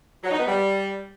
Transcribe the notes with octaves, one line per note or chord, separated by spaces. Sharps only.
F#3
D#4
B3
G3